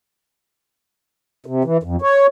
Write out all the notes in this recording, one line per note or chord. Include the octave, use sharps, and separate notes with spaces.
C3
E3
F2
C#5